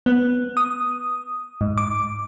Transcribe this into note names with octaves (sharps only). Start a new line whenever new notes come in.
B3
D#6
G#2
D6